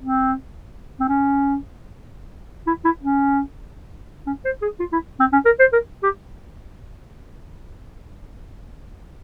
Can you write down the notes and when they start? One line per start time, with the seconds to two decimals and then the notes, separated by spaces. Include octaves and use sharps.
0.01 C4
1.00 C4
1.08 C#4
2.67 E4
2.85 E4
3.03 C#4
4.27 C#4
4.45 C5
4.62 G#4
4.80 F4
4.92 E4
5.20 C4
5.33 C#4
5.46 A#4
5.59 C5
5.73 A#4
6.03 G4